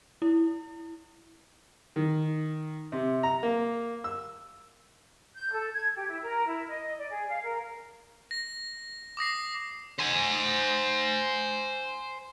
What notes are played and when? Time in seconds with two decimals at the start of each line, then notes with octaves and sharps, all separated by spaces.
0.22 E4
1.96 D#3
2.92 C3
3.23 A#5
3.43 A#3
4.04 E6
5.35 G6
5.51 A4
5.73 G#6
5.95 G4
6.08 E4
6.22 A#4
6.46 E4
6.66 D#5
6.98 D5
7.09 G#4
7.27 F5
7.42 A#4
8.31 A#6
9.17 D6 D#6 A#6 C7
9.99 C5 G#5